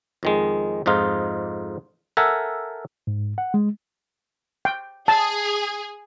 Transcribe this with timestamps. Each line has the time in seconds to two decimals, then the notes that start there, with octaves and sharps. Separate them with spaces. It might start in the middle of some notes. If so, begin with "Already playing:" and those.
0.23 F2 D#3 G#3
0.86 F2 G#2 D#4 F4
2.17 A4 A#4 E5 F#5 G#5
3.07 G#2
3.38 F#5
3.54 G#3
4.65 G5
5.08 G#4 A5